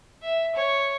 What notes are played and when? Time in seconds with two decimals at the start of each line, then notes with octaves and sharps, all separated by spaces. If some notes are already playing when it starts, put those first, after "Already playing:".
0.23 E5
0.55 C#5